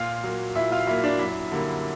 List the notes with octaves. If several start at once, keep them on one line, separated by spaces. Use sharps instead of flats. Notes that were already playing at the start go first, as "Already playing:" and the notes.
Already playing: A#2 F4 F5
F#3 A#3
A#2 E4 E5
F4 F5
F#3 A#3 E4 E5
D4 D5
F#2 E4 E5
D3 G3 A#3